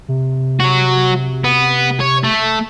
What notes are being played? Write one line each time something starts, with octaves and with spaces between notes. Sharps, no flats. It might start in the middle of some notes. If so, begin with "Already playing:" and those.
C3
F#3 F#4
B3
C#5
A3